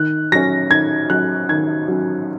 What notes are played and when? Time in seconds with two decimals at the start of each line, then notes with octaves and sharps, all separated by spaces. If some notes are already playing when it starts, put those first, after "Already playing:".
Already playing: D#3 F#6
0.32 F#3 C#4 A#6
0.71 D#3 G#6
1.10 F#3 C#4 F#6
1.49 D#3 G#6
1.88 F#3 C#4